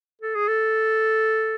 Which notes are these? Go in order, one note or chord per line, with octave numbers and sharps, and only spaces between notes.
A4
G#4
A4